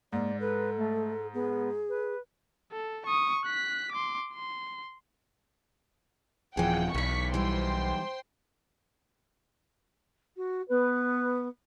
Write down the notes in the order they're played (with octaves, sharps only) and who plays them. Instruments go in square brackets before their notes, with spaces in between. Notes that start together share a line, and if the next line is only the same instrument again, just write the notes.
[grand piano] G#2 [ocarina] A#3 [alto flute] D5
[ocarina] A4 [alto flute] B4
[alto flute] A3
[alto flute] B3 [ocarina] G#4
[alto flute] B4
[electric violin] A4
C#6 D#6
F#6 B6
C6 D6
C6
[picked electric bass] D#1 F3 [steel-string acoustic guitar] E3 G#4 [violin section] F#5 G5
[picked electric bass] B1 [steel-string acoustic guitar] E2 D5 [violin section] C#6 B6
[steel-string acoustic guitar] E3 G3 [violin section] C5 G5 C6
[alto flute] F#4
[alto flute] B3 [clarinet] B4